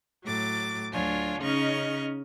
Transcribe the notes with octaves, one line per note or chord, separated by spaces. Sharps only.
A2 F#3 D6 A6
D2 F#3 D4 F4 C#5 G#5
C#3 C#4 D#4 D#5 C#6 F6